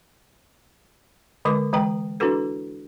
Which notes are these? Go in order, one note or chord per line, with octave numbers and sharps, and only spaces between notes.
D3 G#3 B4 D6
E3 G#3 G5 A#5
D4 E4 F#4 A4 B4